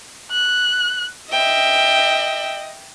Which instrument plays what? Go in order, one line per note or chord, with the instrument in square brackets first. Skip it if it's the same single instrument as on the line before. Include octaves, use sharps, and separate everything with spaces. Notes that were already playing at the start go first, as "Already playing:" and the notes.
[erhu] F#6
[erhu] D#5 [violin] E5 G5